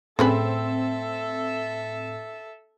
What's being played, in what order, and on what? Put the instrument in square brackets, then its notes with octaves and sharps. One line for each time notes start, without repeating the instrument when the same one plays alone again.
[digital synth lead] A2 [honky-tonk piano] C4 [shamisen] C#4 G#4 B4 [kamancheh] A4 E5